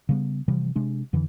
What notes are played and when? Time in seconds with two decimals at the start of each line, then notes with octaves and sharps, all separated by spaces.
0.09 C#3 G3 B3
0.48 C3 E3 F3 G3
0.76 C3 G#3 D4
1.13 F2 D3 E3